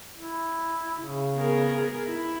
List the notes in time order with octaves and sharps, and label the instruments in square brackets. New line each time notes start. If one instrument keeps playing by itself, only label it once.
[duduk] E4
C#3
[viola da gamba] B3 G#4 A#4
E4